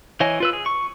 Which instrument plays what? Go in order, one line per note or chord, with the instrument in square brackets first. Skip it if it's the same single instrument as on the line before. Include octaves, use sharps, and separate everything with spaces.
[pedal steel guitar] E3 C#5 D#5 G#5
F4 B4 E6
G#4
C#6